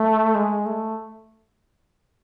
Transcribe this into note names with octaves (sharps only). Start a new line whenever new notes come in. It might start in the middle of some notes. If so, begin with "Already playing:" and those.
Already playing: A3
G#3
A3